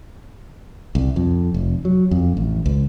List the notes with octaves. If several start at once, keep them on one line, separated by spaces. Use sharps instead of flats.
C2
F2
F1
F#3
F2
A1
C#2